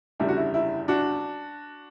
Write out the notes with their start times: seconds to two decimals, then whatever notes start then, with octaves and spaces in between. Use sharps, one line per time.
0.20 F#1 E2 D3 G3 E4
0.28 F#4
0.37 E4
0.54 E4
0.88 D4 F#4